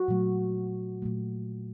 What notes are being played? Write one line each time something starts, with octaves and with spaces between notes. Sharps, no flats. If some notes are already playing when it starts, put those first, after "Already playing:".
Already playing: F#4
A#2 F#3 A3
A#2 F#3 A3